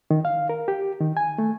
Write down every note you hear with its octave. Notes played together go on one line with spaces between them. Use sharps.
D#3
F5
A#4
G4
D#3
G#5
A3